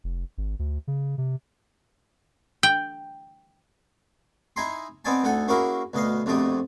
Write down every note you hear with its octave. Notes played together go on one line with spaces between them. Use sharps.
F1
G#1
D2
C#3
C3
G5
D#4 E4 G#5 A#5 C6
B3 C4 D#4 D5 G#5 A5
D2 D#4 A4 F#5 G#5
A#3 C#4 E4 F#4 G#4 A#4
D2 B2 D#5 F5
A#1 F2 B2 A3 G4 D#6